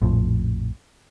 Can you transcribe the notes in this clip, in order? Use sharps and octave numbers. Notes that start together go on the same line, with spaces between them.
A#1 F2 A2 F3